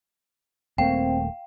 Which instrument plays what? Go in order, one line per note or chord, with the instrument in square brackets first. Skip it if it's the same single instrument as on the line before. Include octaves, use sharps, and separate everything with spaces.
[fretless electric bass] D#1 A3 A#3 [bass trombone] C4 [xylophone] F5 [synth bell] G5